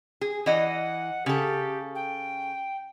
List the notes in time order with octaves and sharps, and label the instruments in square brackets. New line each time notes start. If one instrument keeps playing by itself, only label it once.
[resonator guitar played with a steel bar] G#4
[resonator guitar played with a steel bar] E3 D#5 [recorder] F#5
[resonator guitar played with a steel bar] C#3 A4 [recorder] G4
[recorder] G5